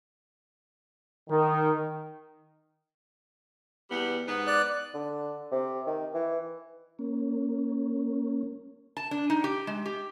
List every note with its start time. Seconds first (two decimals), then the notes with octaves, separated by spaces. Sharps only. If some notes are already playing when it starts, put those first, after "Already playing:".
1.29 D#3
3.90 E2 G3 B3
4.27 G#2 B3 B4
4.47 D5 F#6
4.94 D3
5.52 C3
5.87 D#3
6.14 E3
6.99 A#3 C#4
8.97 A5
9.11 D4
9.30 D#4
9.44 G4
9.67 G#3
9.86 G4